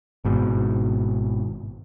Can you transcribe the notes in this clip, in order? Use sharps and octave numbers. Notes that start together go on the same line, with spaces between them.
G#1 G#2 B2